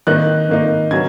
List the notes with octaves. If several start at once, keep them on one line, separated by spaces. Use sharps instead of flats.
D#3 A#3 D#4 F#6
D#3 A#3 D#4
C#3 F#3 C#4 G#6